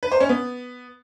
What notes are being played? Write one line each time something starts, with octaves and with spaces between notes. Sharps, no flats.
B4
C5
C#4
B3